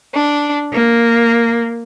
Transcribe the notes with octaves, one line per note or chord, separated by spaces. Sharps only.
D4
A#3